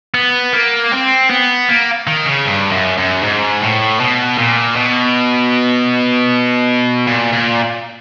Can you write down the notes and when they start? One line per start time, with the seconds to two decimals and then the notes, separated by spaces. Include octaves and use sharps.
0.14 B3
0.53 A#3
0.92 C4
1.30 B3
1.69 A#3
2.07 D#3
2.26 C#3
2.46 G2
2.71 F#2
2.98 F#2
3.23 G#2
3.61 A2
4.00 B2
4.38 A#2
4.76 B2
7.07 A#2
7.33 A#2